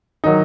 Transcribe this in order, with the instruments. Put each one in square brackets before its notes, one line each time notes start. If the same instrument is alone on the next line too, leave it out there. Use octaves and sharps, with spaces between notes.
[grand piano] D#3 F#3 D#4